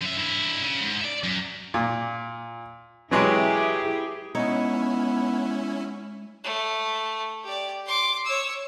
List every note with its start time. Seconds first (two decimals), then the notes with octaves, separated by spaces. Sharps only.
0.02 F#2 E5
0.17 G2 E4
0.62 C#3
0.81 G#2
1.01 D5 E5
1.24 F#2
1.74 A#2
3.11 E3 F#3 G#3 E4 G4 G#4
4.35 G#3 B3 C#4 D#4 E4 C#5
6.45 A3
7.44 G4 D5
7.86 C6 D6
8.26 C#5 E6